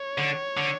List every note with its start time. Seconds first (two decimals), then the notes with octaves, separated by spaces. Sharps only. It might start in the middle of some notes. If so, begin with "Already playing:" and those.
Already playing: C#5
0.18 D3
0.57 D3